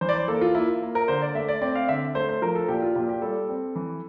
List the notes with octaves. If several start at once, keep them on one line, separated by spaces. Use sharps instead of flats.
E3 C5
D5
C5
A#3 A4
F4
A#3 E4
F4
A#3
A#4
D3 C5
D5
A3 E5
D5
C4 D5
F5
D3 E5
A3 C5
C5
F3 A#4
A4
A#2 G4
F4
A#2 G4
G4
G3 A4
C4
E3